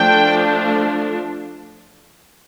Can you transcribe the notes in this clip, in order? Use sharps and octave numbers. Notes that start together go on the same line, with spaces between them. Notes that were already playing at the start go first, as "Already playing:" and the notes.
Already playing: F3 A3 D4 G5